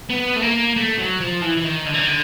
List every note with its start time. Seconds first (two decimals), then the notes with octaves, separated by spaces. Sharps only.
0.10 B3
0.36 A3
0.42 A#3
0.76 A3
0.98 F#3
1.20 F3
1.42 E3
1.57 E3
1.64 D#3
1.86 D3
1.94 E3
2.01 D#3
2.08 D3